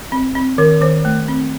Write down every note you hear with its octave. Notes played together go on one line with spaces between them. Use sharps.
C4
C4
D#3 A#4
D#3 C5
A3
C4